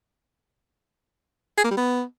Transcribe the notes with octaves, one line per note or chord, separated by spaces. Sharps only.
G#4
A#3
G3
B3